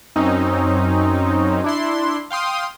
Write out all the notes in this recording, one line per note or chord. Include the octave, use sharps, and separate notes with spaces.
F#2 C4 C#4 D#4
D4 E4 C6
F5 G5 C6 D#6